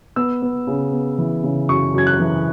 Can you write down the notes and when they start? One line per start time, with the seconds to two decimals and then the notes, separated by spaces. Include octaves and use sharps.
0.16 B3 E6
0.42 B3
0.67 C#3
0.93 B3
1.18 E3
1.44 C#3
1.69 F#2 C#6
1.94 F#2 G#6
2.07 F#6
2.19 E3